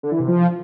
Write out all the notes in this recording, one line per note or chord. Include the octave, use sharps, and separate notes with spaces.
D3
E3
C3
F3